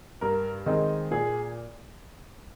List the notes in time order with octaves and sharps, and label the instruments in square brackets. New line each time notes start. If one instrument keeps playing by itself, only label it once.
[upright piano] G2 A#4
D#3 G#3 C4 D#4
A#2 G#4